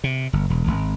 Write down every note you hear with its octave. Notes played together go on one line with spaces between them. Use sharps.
C3
G1
E1
G#1